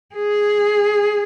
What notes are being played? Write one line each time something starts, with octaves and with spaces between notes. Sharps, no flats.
G#4